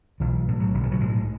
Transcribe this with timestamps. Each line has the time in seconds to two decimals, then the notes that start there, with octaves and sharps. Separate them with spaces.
0.20 B1 E3
0.48 A2
0.60 F#3
0.74 B1 D3
0.83 E3
0.92 F#3
1.00 A2 G#3